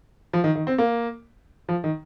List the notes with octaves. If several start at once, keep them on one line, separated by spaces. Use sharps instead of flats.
F3
D#3
D#3
C4
A#3
F3
D#3